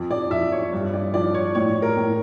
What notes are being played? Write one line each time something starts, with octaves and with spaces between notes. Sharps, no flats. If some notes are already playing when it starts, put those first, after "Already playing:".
Already playing: F2
D5
F2 E5
C#5
G2
D5
F3 D5
C#5
A2 C#5
A#4
A2